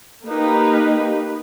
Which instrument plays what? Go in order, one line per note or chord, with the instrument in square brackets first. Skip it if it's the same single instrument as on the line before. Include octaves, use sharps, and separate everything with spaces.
[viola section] A#3 D#4 G4 B4